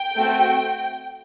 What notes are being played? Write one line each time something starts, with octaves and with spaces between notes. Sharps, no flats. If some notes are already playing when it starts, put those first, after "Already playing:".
Already playing: G5
A3 C4 F#4